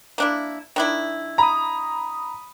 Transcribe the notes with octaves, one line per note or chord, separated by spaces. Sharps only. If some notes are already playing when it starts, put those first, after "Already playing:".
A#3 D4 E4
D#3 D4 E4
A#5 B5 D#6